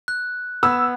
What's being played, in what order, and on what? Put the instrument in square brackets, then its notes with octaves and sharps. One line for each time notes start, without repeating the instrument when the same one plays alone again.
[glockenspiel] F#6
[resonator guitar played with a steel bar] B3 [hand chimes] F#5 G#6 [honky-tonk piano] E6